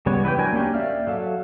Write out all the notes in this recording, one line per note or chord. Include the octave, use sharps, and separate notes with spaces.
C#3 G3 B3 C#5
E3 B4 D#5 G5
F#3 D4 A#4 G#5
A#3 C#4 D4 G4
D5 E5 F5 F6
F#3 A4 F5